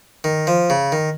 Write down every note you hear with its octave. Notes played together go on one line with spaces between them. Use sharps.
D#3
F3
C#3
D#3